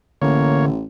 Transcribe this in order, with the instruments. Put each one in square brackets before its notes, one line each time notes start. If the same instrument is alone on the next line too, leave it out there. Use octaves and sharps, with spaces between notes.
[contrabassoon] A1 [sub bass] D3 [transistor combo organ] A#3 C#5